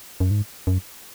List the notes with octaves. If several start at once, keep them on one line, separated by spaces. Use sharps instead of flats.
F#2
G#2
F#2